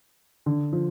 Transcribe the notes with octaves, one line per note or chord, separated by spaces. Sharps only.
D3
F3